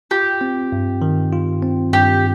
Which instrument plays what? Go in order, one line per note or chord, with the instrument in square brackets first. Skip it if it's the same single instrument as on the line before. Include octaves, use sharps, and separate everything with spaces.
[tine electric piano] F4 [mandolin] G4
[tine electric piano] C4
G2
D#3
F4
C4
[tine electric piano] G2 [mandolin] G4